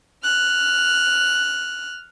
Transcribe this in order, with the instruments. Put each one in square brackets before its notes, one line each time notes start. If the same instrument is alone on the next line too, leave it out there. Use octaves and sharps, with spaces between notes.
[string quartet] F6 F#6